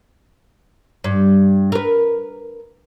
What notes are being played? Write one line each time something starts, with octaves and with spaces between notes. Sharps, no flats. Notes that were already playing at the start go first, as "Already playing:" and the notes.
G2
A#4 B4